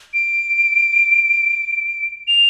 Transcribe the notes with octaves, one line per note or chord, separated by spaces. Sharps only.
D7
F7